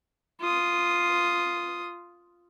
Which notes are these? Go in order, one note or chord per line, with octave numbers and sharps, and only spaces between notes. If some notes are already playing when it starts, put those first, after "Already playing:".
F4 D#6